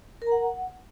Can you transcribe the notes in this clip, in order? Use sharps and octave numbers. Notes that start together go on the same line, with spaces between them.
A#4
A#5
F#5